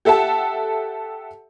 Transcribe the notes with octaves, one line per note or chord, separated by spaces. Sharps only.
G4 A4 E5 F#5 A5